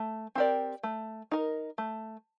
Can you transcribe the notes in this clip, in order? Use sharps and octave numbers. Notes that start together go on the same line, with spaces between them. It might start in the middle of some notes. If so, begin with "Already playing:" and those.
Already playing: A3
C4 G4 A#4 D5
A3
D#4 A#4
A3